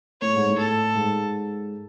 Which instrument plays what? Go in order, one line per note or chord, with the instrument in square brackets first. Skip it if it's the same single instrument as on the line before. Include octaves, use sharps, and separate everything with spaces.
[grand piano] A2 [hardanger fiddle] C#5
[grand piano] G#2
A2
[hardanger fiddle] A4
[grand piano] G#2